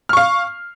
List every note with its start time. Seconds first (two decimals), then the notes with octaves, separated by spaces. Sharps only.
0.09 F6
0.13 C#6
0.17 F5